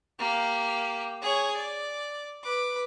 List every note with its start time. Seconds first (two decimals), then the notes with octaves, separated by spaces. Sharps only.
0.19 A#3 G4
1.22 G#4 C#5
1.56 D5
2.43 B4 D6